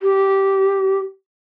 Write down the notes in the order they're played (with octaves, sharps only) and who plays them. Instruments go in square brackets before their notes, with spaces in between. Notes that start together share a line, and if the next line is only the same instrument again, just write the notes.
[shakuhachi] G4